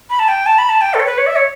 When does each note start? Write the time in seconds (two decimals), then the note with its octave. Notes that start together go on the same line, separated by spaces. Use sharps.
0.10 B5
0.19 A5
0.28 G5
0.46 A5
0.58 B5
0.69 A5
0.81 G5
0.94 A4
1.00 C#5
1.06 B4
1.18 C#5
1.27 E5
1.36 C#5